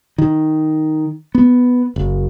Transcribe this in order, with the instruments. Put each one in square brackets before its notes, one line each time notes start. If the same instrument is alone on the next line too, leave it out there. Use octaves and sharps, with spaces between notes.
[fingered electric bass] D#3
B3
F#1